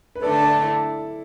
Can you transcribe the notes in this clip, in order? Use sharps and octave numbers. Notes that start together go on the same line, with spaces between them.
B4
D3 A3 D4 A4 D5
A4 D5
E4 A4